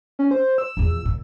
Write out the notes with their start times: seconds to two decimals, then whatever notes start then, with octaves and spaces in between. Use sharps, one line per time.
0.19 C#4
0.31 C5
0.58 E6
0.77 A#1 E2
1.05 A#2